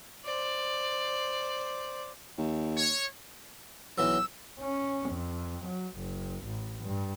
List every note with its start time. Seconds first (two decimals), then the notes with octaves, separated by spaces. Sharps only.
0.24 C5 D5
2.38 D#2
2.77 C#5
3.98 B1 E3 F#3 E6
4.59 C#4
5.09 F2
5.65 F#3
5.96 F#1
6.45 A1
6.84 G2